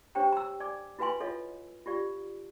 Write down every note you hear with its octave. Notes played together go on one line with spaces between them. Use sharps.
D4 G4 C5 C#5 G5 A#5
A#5 E6
D5 G#5 D6
E4 F#4 B4 F5 G#5 C6
F4 A4 C#5 D#5 F5
F4 G4 D5 F5